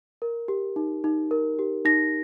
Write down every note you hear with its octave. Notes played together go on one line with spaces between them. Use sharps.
A#4
G4
D#4
D#4
A#4
G4
D#4 A#6